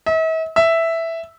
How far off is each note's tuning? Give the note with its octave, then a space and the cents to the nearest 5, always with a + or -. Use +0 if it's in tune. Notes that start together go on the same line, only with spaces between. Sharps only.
E5 -45
E5 +0